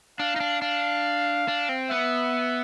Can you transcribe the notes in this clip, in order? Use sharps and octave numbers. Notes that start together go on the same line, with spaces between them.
D4 F5
D#4
D4
D4 F5
D4
C4
B3 E5